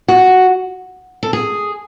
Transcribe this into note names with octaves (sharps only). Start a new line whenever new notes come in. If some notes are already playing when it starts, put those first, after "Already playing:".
F#4
A4
G#4